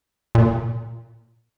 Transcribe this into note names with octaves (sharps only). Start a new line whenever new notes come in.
A#2